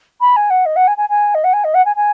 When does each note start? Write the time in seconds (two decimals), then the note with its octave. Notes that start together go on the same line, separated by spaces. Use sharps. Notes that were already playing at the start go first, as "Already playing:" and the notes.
0.20 B5
0.36 G#5
0.50 F#5
0.65 D#5
0.76 F#5
0.87 G#5
0.97 G#5
1.09 G#5
1.34 D#5
1.44 F#5
1.53 G#5
1.64 D#5
1.74 F#5
1.85 G#5
1.96 G#5